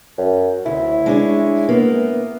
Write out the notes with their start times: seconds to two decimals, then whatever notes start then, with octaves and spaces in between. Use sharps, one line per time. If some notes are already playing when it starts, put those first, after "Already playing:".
0.18 F#2
0.66 D2 E4
1.06 G#3 D4 C#5
1.69 A#3 B3